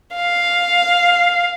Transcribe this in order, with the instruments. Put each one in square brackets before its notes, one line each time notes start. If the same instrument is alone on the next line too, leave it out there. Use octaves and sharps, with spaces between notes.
[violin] F5